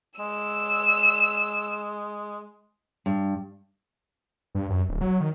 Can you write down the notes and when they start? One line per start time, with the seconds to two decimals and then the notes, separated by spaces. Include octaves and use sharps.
0.19 G#3 E6 E7
3.06 G2
4.55 G2
4.70 F#2
4.89 D1
5.01 F#3
5.21 D#3